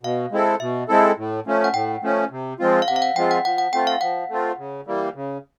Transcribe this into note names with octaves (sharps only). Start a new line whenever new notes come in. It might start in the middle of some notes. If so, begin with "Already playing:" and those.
B2 F5
G#3 C4 E4 A4
B2 E5
G#3 C4 E4 A4
A2
F3 A3 C#4
F#5
A2 G5
F3 A3 C#4
C3
F3 G#3 C4 F4
F5
C3 F#5
F5
F#5
F3 G#3 C4 F4 G5
F#5
F3 F#5
F#5
A3 C4 F4 G5
F5
F3 F#5
A3 C4 F4
C#3
E3 G3 A#3
C#3